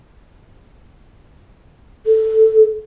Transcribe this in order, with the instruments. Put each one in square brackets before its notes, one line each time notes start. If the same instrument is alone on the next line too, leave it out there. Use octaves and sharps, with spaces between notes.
[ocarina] A4